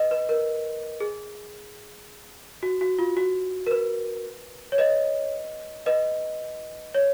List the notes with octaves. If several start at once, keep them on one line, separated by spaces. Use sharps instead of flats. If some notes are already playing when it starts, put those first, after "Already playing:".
Already playing: B4 D#5
B4
A#4
G#4
F#4
F#4
F4
F#4
A#4
B4
C#5
B4 D#5
B4 D#5
C#5